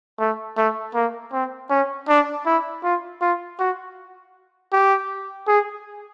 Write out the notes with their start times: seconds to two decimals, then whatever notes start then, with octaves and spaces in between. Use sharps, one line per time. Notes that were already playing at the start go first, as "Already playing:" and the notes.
0.19 A3
0.57 A3
0.95 A#3
1.33 C4
1.70 C#4
2.08 D4
2.46 E4
2.83 F4
3.21 F4
3.59 F#4
4.72 G4
5.47 G#4